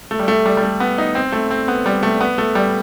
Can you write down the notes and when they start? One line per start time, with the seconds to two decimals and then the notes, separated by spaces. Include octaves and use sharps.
0.11 A3
0.19 G3
0.28 A3
0.46 G3
0.57 G3
0.63 A3
0.80 B3
0.98 D#4
1.15 C4
1.32 A3
1.51 C4
1.68 B3
1.86 G3
2.03 A3
2.21 B3
2.38 A3
2.55 G3